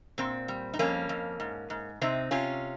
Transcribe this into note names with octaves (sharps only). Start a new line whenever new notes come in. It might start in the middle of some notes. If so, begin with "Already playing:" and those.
A#2 C4
G3
D#4
F2 A#3 C#4
F2
G#2
G#2
C3 C4 D#4
C3 C#4 F4